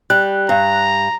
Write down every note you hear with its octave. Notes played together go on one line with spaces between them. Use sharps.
G3 F#6
G2 A#5